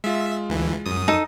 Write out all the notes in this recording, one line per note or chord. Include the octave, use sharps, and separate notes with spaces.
G#3 F4 E5
D2 E3
F#2 D#6
D#4 A4